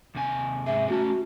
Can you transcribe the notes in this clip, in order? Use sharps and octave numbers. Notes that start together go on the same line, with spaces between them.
D#2 C3 G#5
G#2 C3 G#4 E5
A3 C#4 F#4 A5